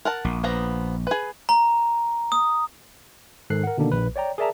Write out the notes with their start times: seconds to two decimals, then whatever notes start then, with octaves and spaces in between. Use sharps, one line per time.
0.05 A#4 F#5 A5
0.25 A#1
0.44 F3 B3 A#5
1.07 G#4 B4
1.49 A#5
2.32 D#6
3.50 G#2 D#3 A4 F#6 C7
3.64 A#4 F#5
3.78 B2 D3 D#3 A#3 D4
3.92 A#1 B4
4.16 C#5 D5 G5 A#5
4.38 G#4 A#4 D5 E5 A5 A#5